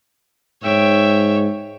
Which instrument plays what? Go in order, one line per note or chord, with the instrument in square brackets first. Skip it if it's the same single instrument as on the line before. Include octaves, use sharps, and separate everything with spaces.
[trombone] G#2 [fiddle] C#5 [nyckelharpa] E5 G5